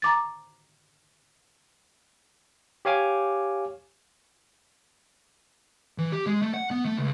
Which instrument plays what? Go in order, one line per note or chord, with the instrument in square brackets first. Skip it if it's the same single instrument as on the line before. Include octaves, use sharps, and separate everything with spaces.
[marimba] A#5 D6 A6
[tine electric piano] G4 C#5 F5 G#5 D6
[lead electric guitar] E3
G4
G#3
A3
F#5
B3
A3
C#2